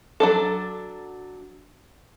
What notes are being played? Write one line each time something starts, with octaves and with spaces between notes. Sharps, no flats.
F#3 D4 A4